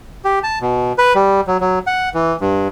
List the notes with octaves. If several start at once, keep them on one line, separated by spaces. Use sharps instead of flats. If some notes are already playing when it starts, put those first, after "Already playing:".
G4
A5
B2
B4
G3
F#3
F#3
F#5
E3
G2